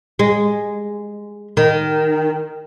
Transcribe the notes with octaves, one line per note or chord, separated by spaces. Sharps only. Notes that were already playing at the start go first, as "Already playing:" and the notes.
G#3
D#3